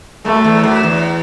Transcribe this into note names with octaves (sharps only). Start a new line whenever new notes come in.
F#2 A3
E2
F#2
E2